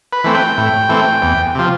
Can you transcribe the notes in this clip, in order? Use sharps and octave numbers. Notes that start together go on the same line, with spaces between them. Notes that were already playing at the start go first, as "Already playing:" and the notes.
B4
E3 A3 C4
G5
A2
E3 A3 C4
E2
C3 F3